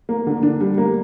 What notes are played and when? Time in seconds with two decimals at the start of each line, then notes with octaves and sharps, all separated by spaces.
0.09 A#3
0.27 D3
0.43 D4
0.60 G3
0.78 A#3